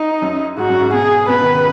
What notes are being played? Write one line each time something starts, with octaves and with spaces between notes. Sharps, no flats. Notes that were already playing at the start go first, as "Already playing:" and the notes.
Already playing: D#4
F#2
G#2 F#4
F#2
G#2
B2 G#4
B2 B4
D#3
C#3